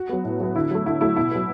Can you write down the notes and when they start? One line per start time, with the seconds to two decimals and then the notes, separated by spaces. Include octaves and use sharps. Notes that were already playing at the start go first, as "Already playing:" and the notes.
Already playing: F#4
0.09 F#3 B3
0.24 A2
0.40 F#3 B3
0.55 D3 E4
0.71 F#3 A3
0.86 D3 E4
1.01 F#3 A3 E4
1.16 B2 E4
1.31 F#3 B3